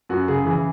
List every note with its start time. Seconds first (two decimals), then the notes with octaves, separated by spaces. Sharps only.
0.09 F#2 F#4
0.28 C#3 G#4
0.45 E3